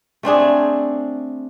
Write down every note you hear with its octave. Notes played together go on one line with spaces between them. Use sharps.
A3 C4 D4 G#4